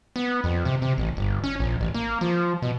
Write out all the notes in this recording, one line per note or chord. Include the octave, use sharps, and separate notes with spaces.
B3
F2
C3
C3
A1
G1
C#4
A#1
A1
A#3
F3
B2